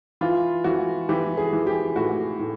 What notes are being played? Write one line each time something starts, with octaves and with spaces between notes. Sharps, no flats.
E3 F4
E3 F#4
E3 G4
G#4
E3
G4
A2 F#4
A2